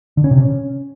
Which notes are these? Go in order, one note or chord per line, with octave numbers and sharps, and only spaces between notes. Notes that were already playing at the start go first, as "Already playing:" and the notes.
D3
C#4
C3
C#4